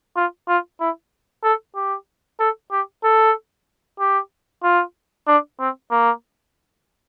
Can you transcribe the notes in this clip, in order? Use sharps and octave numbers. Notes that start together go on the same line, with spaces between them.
F4
F4
E4
A4
G4
A4
G4
A4
G4
F4
D4
C4
A#3